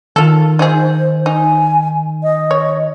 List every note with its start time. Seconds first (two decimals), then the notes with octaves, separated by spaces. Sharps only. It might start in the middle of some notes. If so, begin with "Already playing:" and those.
0.16 D#3 F4 A4
0.59 D#4 F4 G#4 C5
1.26 D#4 G#5
2.23 D#5
2.51 C#5